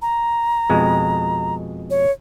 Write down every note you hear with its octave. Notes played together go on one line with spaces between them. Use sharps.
A#5
F2 B2 G#3
C#5